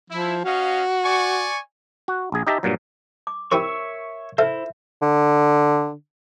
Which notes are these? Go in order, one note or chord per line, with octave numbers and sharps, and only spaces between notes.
F3 E4
C#4 F#4 D#5 F5
D5 G#5 C#6
F#4
A#1 G#4
D#4 G4 D#5 E5 A5 A#5
G2 A#2 F#3
D6
C4 E4 G4 A#4 C#5 E5 C#6
E4 A4 C5 E5 F5
D3